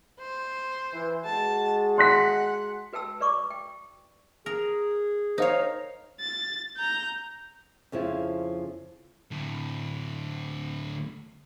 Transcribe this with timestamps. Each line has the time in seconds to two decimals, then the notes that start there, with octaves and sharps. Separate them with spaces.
0.20 C5
0.93 E3
1.25 G#3 F#4 G#4 A5
1.98 F#5 C6 F#6 B6
2.93 F#4 B4 G5 A5 E6
3.20 B4 D5 C#6 D6
3.50 G5
4.46 G#4 A#4
5.38 D#4 A#4 C5 C#5 D#5 F5
6.20 A6
6.77 A#5 G6
7.92 F2 C#3 F3 E4
9.31 D2 A2